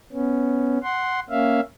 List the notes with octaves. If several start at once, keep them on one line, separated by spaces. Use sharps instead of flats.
B3 C#4
F#5 C6
A#3 C#4 E5 F5